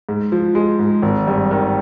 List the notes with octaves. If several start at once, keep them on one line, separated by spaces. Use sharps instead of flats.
G#2
F3
G#3
G#2
G#1
G2
D#3